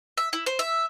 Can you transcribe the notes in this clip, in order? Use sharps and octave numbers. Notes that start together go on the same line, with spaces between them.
E5
E4
C5
E5